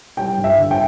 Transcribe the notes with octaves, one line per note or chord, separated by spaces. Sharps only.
G3 G5
G2
E5
D3
G5